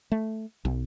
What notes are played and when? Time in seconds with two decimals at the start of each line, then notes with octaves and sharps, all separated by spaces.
0.12 A3
0.65 B1